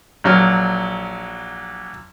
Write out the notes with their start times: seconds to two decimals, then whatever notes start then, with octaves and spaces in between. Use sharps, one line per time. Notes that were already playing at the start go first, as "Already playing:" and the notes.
0.24 A#1 F#3 F6